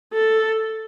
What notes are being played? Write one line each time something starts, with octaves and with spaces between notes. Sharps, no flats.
A4